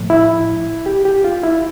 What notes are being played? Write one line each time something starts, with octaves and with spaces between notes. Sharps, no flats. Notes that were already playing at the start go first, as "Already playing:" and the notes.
Already playing: A2 F3
E4
G4
G4
F4
E4